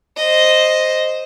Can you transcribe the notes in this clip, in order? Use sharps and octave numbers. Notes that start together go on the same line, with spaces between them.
C5 D#5